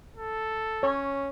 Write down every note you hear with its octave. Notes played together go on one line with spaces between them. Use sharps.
A4
C#4 C#5